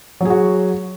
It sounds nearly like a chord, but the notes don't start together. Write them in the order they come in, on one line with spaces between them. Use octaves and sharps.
F#3 G#4 F#4